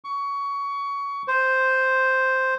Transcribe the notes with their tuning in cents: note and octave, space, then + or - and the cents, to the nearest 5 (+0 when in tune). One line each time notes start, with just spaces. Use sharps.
C#6 +20
C5 +0